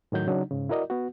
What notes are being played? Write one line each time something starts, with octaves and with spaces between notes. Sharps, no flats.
A2 D#3 F#3 G6
C#3 F#3 D4 D#4
G#2 C#3
E4 F#4 A#4 D5 D#5
B3 F#4